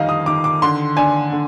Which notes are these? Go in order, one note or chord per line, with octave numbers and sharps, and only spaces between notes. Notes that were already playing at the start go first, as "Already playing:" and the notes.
Already playing: F2 D#3 G3 D#5 F5
D#6
D#3 D6
D6
D3 C6
D4 G#5
D3